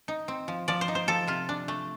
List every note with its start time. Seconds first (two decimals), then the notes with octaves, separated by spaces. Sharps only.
0.08 D#4
0.28 C4
0.48 F3
0.68 F3 D5
0.81 C5
0.88 D#4
0.95 C5
1.08 F3 A4
1.27 C3 F4
1.49 D4
1.68 A3